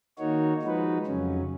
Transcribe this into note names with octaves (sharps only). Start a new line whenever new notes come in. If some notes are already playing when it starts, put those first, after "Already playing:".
D#3 A#3 D#4 F#4 C#5
F3 G#3 D#4 F#4 B4
F2 C#3 F#3 C#4